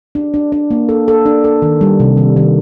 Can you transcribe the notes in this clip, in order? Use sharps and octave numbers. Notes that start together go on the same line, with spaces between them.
D4
D4
D4
A#3
A4
A4
D4
A4
D#3
G3
C3
D#3
D#3